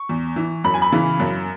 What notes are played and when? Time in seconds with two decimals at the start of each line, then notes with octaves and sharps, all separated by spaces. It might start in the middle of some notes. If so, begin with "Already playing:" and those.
Already playing: C#6
0.09 E2
0.36 E3
0.64 F#2 B5
0.74 G#5
0.82 B5
0.92 C#3 E3
1.20 F#2